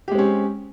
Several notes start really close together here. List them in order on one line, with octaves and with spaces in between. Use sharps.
G4 G#3 C4 C#4